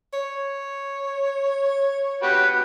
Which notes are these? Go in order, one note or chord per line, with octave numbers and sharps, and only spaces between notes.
C#5
F#4 G4 B4